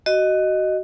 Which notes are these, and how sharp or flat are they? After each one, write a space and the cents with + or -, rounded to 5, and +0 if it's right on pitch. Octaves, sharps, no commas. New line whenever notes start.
F#4 +20 D#5 -5